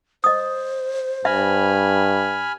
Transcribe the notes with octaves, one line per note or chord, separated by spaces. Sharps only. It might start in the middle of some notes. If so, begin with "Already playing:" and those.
C5 D#5 D#6
G2 E5 G#5 B5 F6